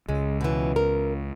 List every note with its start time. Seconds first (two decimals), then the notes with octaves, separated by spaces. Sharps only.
0.09 C#2 G#3
0.41 B2 E3
0.76 A#4